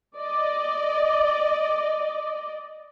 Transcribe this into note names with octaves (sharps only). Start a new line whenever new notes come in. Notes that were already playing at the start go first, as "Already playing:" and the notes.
D5 D#5